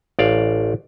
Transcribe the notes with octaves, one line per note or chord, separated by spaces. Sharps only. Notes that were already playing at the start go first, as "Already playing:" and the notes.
A1 D5 F5